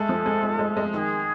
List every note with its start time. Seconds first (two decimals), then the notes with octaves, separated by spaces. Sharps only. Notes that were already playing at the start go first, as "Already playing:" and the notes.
Already playing: G#3 A3 A4
0.09 F3
0.26 G#3
0.43 G#3
0.59 G#3
0.77 G#3
0.93 D#3 G#4 A4